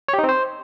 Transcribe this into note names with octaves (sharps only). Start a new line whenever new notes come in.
C#5
G4
D#4
C4
C5